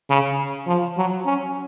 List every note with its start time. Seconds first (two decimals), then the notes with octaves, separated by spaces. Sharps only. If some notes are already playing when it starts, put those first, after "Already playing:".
0.10 C#3
0.67 F3
0.97 F#3
1.26 C#4